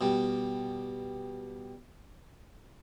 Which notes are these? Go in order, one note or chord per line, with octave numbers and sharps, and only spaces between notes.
B2 G3